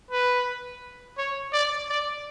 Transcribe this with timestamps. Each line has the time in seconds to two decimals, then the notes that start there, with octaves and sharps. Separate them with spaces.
0.11 B4
1.17 C#5
1.53 D5
1.89 D5